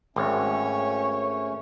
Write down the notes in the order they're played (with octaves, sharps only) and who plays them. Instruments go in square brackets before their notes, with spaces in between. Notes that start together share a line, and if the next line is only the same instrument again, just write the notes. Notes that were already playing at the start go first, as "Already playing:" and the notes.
[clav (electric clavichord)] G#1 [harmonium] A3 C#4 [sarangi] C#5